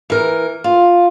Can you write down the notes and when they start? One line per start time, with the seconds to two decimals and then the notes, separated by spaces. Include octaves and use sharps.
0.10 E3 A#4
0.64 F4